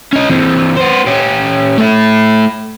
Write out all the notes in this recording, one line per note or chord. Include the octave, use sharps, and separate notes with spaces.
C#4 D#5
E3 C4
B3 C5
C#4 G4
A3 E4